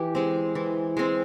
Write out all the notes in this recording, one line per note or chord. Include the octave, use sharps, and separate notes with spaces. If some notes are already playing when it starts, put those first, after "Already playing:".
Already playing: E3 G4
G#3 C4
E3
G#3 C4